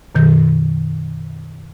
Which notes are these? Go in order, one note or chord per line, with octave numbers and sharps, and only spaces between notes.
F#2 B2 D#3 G6